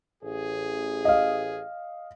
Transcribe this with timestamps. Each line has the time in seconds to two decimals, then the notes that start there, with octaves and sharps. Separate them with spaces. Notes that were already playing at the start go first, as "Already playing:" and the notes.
0.23 A1 G#4
1.05 D#5 F5